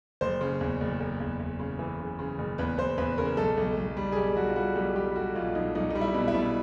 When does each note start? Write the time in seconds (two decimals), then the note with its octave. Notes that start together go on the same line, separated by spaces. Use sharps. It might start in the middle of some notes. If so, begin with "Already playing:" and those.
0.21 F#1 C5
0.41 C#3
0.61 E2
0.80 F#1
1.00 F#1
1.20 E2
1.40 E2
1.60 C#3
1.79 E3
1.99 C#3
2.19 C#3
2.38 F#1
2.58 E2 B4
2.78 E2 C5
2.98 E2 B4
3.18 C#3 A#4
3.37 B1 A4
3.57 B1
3.77 B1
3.97 G3
4.12 G#4
4.16 B1 G4
4.37 B1 F#4
4.49 F4
4.56 G3 F#4
4.76 B1 G4
4.96 G3 G4
5.16 G3 F#4
5.35 B1 F4
5.55 B1 D#4
5.75 B1 D#4
5.90 G3 D#4
6.01 E4
6.14 B2
6.28 E4
6.35 B2